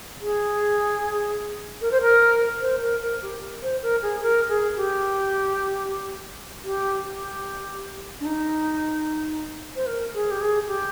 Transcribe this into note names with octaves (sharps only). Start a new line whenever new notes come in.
G#4
A#4
C5
A#4
C5
A#4
A#4
G4
C5
A#4
G#4
A#4
G#4
G4
G4
G4
D4
D#4
C5
A#4
G#4
G4
G#4
G4